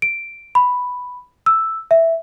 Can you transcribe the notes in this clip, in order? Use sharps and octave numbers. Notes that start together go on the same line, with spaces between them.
D7
B5
E6
E5